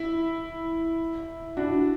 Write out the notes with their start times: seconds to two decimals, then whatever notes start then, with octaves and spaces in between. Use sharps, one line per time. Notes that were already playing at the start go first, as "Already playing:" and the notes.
Already playing: E4
1.57 D4 F#4